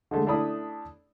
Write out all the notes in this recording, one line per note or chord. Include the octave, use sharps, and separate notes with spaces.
D3 G#3 A3
A3 D4 E4 B5 D#6